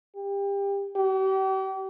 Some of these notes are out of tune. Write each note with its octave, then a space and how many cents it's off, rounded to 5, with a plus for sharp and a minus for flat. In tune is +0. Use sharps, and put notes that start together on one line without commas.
G4 +25
G4 -40